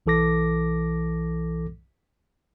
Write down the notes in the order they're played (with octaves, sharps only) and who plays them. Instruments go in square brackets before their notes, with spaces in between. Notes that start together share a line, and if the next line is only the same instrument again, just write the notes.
[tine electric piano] B1 E3 A4 D6 A#6